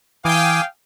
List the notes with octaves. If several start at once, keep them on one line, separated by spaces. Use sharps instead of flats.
E3 F5 G5 G#5 D6 D#6